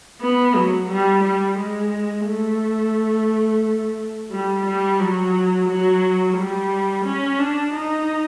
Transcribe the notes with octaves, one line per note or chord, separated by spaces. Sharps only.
B3
F#3
G3
G3
G#3
A3
G3
G3
F#3
F#3
G3
C#4
D4
D#4